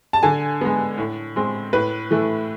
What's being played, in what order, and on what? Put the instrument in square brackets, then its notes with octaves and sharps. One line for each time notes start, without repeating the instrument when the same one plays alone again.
[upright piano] A5
D3 G#5
G#3 B3
A2
G#3 C4
A2 B4
E3 A3